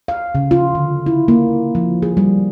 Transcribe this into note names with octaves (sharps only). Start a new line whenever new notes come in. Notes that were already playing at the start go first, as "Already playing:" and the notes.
F5
C#3
F4
D3
E4
A#3
F3
G#4
G3